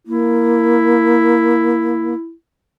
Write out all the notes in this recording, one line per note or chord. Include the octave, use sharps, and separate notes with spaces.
A#3 E4